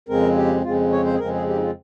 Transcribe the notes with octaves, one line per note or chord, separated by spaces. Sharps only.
F2 C#3 G#3 C4 A#4
G4
F2 C#3 G#3 C4 F4
C#5
C5
G#4
F2 C#3 G#3 C4 A#4
G#4
G4
D#4
F4